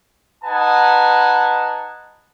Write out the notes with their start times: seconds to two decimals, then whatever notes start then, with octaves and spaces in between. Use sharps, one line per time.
0.44 D#4 B4 F#5 G#5 A5